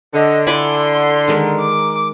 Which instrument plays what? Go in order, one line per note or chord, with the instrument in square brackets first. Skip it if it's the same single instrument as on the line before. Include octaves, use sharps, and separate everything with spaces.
[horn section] D3 [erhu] D#5
[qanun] E4 D5 G#5 [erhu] C6
[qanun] D#3 G#3 A#4
[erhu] D6